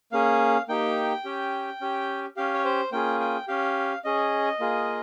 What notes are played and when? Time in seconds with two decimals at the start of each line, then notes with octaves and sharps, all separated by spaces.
0.12 A#3 C#4 G#4 F5
0.68 A#3 D#4 G4 G5
1.25 C#4 G4
1.81 C#4 G4
2.36 C#4 G4 F5
2.54 C#5
2.65 C5
2.92 A#3 C#4 F4 G#4 G5
3.20 G5
3.48 C#4 G4 F5
4.04 C#4 G#4 D#5
4.60 A#3 F4 G#4